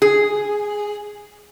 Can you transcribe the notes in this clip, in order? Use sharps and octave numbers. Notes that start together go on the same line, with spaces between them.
G#4